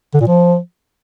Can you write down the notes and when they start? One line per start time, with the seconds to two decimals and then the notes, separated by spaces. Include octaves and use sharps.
0.14 D3
0.21 A#2
0.27 F3